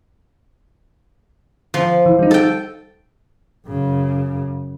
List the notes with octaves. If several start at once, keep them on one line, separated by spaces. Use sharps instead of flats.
F3
E3
G3 D#4
A4 G5
F#2 C#3